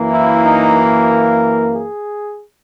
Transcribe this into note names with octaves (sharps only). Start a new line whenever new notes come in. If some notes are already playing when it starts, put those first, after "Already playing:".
Already playing: F#2 E3 A#3
E4
D#4
A#4
G#4